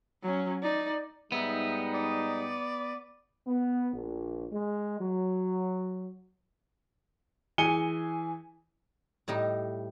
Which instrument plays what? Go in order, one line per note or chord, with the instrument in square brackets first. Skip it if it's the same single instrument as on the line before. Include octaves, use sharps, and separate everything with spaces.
[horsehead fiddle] F#3 C#4
D#4 D5
[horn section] G#2 G3 D#4 [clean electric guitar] B3 [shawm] E5
[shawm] D5
[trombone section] B3
A#1
G#3
F#3
[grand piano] E3 G#4 G#5 C#7 D#7 G7
[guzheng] A2 G3 D#4